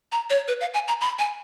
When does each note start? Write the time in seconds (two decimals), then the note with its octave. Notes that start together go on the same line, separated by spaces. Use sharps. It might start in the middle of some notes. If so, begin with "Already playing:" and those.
0.12 A#5
0.30 C#5
0.48 B4
0.61 F5
0.74 G#5
0.88 A#5
1.01 B5
1.19 G#5